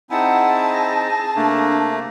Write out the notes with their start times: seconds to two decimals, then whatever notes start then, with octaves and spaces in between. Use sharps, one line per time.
0.10 C4 D#4 E4 G#4 F#5 A5
0.72 A#6
1.36 C3 A3 A#3 D4